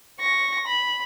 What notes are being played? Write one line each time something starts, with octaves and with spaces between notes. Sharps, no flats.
C#6 A#6
B5